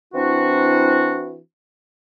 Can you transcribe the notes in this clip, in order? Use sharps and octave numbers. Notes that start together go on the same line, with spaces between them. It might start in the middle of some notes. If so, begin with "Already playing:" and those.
E3 C4 D4 E4 F#4